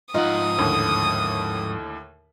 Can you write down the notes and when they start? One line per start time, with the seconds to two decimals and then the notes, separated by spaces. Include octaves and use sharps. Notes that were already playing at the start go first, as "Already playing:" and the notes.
0.14 G#2 F3 D#4 F4 F#5 D#6
0.58 D#2 A2 D3